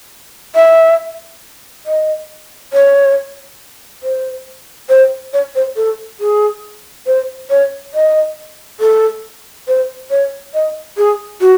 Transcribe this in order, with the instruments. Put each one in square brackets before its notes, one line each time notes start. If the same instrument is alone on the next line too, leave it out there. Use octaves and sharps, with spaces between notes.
[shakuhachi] E5
D#5
C#5
C5
C5
C#5
C5
A4
G#4
C5
C#5
D#5
A4
C5
C#5
D#5
G#4
F#4